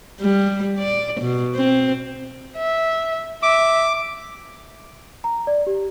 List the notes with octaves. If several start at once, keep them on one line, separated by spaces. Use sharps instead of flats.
G3
D5
B2
C4
E5
E5 D6
A#5
D5
G4